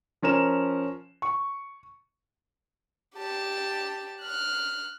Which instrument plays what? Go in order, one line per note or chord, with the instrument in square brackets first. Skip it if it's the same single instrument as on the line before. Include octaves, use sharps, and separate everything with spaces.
[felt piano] F3 C#4 A#4 E7
C#6
[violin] G4 A5
F6 F#6